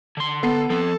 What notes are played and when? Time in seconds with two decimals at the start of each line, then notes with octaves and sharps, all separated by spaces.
0.17 D3 C6
0.43 B3 A4 C7
0.70 F3 C4 A4